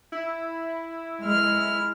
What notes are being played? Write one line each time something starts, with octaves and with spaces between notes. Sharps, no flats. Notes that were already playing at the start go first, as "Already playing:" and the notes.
E4
G#3 F6